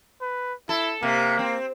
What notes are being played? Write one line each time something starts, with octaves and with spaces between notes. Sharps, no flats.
B4
E4 A4
C3 A#3
C4